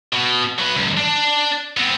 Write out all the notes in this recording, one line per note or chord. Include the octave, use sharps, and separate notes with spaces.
B2
F#3 B4
C#2 F#2
D4
B3 C4